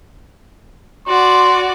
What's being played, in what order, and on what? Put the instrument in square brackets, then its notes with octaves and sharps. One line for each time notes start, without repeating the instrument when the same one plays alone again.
[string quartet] F#4 D5 [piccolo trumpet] C6